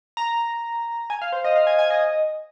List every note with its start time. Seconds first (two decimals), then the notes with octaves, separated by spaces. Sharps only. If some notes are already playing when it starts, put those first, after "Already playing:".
0.17 A#5
1.10 G#5
1.22 F5
1.32 C5
1.44 D#5
1.56 F5
1.67 G#5
1.79 G#5
1.90 D#5